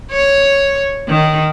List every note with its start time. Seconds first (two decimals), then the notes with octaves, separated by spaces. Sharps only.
0.11 C#5
1.09 D#3